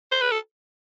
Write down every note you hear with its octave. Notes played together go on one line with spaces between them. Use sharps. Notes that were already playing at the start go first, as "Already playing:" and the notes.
C5
B4
A4